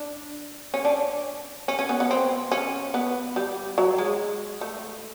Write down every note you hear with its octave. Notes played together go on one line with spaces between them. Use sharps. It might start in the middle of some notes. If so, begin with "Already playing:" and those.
Already playing: D4
C#4
D4
C#4
C#4
B3
B3
C4
C#4
B3
G3
F#3
G#3
A3